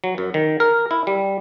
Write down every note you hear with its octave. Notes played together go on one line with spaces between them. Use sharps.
F#3
F#2
D#3
A#4
E4
G3